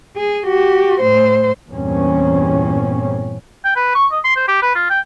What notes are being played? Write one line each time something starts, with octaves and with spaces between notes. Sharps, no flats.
G#4
F#4 G4
A2 C5
E2 G2 A#2 C4 C#4
G5
B4
C#6
D#5
C6
C5
G4
B4
F4
G5